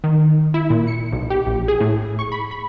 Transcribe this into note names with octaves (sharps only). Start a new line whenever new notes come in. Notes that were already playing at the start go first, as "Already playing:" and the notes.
D#3
E4
A#2
C#7
B1
G4
A#1
G#4
A2
C#6
B5
B5